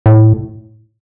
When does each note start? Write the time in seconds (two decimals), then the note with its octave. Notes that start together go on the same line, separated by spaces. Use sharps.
0.06 A2